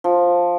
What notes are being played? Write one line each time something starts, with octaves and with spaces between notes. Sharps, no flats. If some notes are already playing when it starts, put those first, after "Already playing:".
F3